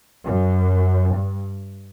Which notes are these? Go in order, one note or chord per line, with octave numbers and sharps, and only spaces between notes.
F#2
G2